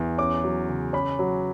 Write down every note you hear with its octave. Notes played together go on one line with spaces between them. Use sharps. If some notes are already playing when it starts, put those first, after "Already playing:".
Already playing: E2
C#4 D6
F#3
C#3
C#4 B5
F#3